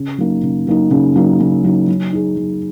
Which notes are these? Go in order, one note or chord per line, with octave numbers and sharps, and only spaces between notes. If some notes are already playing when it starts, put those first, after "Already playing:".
Already playing: C#3
F#3 A#3 D#4
C#3
F#3 A#3 D#4
C#3
F#3 A#3 D#4
C#3
F#3 A#3 D#4
F#3
D#4 G#4
F#3